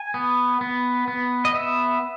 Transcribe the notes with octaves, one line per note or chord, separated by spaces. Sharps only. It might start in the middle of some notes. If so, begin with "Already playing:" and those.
Already playing: G#5
B3
B3
B3
D#5
B3 E5